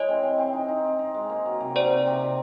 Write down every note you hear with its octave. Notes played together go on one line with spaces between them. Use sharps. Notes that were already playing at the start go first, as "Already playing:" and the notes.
Already playing: E3 G#3 C#5 D#5
C4
C4
C4
D#4
D#4
C4
D#4
G#3
A#3
F#3
C3
F#3 C5 D5
C3
C3
C3